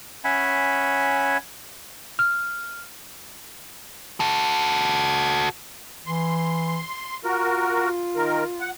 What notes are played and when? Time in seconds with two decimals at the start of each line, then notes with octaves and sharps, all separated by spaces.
0.24 C#4 C#5 E5 F#5 G#5 B5
2.19 F6
4.20 F#4 A4
6.07 E3 C6
7.24 F4 F#4 A#4
8.16 D#3 A#4
8.60 F#5